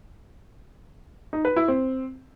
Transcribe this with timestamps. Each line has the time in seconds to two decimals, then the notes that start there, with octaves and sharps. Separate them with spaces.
1.33 D#4
1.45 B4
1.56 E4
1.68 C4